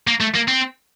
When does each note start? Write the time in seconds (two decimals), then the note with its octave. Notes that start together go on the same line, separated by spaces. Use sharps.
0.07 A#3
0.21 A3
0.35 A#3
0.48 C4